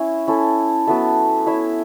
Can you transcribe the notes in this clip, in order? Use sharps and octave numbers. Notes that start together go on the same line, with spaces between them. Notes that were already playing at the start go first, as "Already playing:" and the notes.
Already playing: C#4 E4 C#5 E5
C#4 E4 A4
F#3 B3 A4 E5
E4 C#5 E5